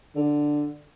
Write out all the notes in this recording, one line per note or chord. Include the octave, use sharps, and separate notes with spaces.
D3